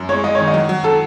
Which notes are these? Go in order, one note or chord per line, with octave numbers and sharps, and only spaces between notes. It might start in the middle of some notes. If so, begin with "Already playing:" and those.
Already playing: F#2
G#3 C#5
G#3 D#5
D#3 C#5
D#5
F#3
F#3
F#3 A4